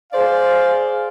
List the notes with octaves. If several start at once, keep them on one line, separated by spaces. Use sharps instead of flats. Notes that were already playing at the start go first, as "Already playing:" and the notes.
G#4 C5 D5 F5